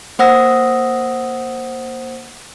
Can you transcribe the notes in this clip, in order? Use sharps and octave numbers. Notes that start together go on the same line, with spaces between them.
A#3 C5 F#5 D#6 E6 A#6